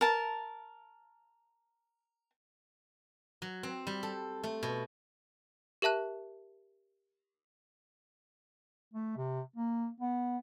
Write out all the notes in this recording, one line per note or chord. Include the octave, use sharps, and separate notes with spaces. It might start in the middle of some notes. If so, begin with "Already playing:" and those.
A#4 A5
F#3
C4
G3
A4
A3
B2
G4 A#4 E5 A5 F#6
A3
C3
A#3
B3